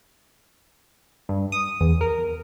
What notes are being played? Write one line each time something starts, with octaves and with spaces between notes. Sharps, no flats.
G2
D#6
E2
A#4